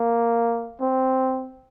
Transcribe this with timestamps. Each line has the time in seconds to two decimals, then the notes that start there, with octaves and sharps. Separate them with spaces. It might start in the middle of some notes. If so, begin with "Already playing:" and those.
Already playing: A#3
0.81 C4